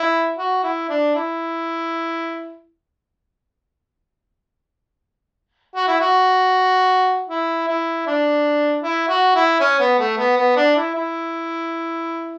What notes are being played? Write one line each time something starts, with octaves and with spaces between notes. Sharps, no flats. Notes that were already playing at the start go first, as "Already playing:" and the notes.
Already playing: E4
F#4
E4
D4
E4
F#4
E4
F#4
E4
E4
D4
E4
F#4
E4
C#4
B3
A3
B3
B3
D4
E4
E4